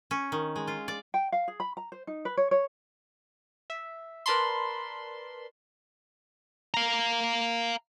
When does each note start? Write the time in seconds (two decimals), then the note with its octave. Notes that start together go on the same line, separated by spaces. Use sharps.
0.11 C#4
0.32 D#3
0.56 G#3
0.68 F4
0.88 D5
1.14 G5
1.32 F5
1.48 G#4
1.60 B5
1.77 A#5
1.92 C5
2.07 D#4
2.25 B4
2.37 C#5
2.51 C#5
3.70 E5
4.26 A#4 B4 D5 A5 B5 C6
6.74 F5 A#5